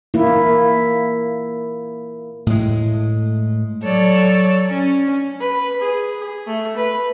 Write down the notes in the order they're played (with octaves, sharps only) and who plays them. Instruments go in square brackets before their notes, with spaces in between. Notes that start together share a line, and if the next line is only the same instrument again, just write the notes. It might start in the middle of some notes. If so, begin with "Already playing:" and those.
[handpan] A#3 E4
[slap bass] A2 G#3
[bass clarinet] F#3 [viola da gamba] A4 C#5 D5
[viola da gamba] C#4
[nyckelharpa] B4
G#4
A3
B4